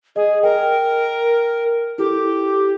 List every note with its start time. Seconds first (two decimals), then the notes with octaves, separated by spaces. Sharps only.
0.16 G#4 D#5
0.43 A#4 G5
1.98 E4 G4 A4